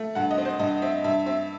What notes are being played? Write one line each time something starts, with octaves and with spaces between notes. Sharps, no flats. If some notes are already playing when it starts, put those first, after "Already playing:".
Already playing: A3
G2 F#5
D#5
C4
C5
G2 D#5
C4 E5
G2 E5
C4 E5